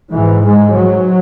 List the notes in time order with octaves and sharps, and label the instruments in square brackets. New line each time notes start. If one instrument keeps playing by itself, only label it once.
[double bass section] G#2 E3
G#3
F#3